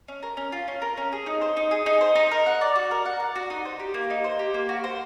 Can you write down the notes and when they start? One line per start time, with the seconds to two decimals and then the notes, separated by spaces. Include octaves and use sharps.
0.08 C#4
0.23 A#4
0.37 C#4
0.52 F4
0.68 C#4
0.82 A#4
0.97 C#4
1.13 G#4
1.26 D#4
1.42 C5
1.57 D#4
1.71 G#4
1.86 D#4
2.01 C5
2.16 D#4
2.31 A#4
2.46 F#5
2.61 D5
2.75 F#4
2.91 A#4
3.05 F#5
3.20 D5
3.36 F#4
3.50 D#4
3.65 C5
3.79 G4
3.94 A#3
4.10 D#4
4.24 C5
4.39 G4
4.54 A#3
4.69 F#4
4.84 C5